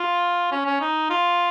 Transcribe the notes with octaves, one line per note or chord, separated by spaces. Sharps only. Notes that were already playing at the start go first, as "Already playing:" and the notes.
Already playing: F4
C#4
C#4
D#4
F4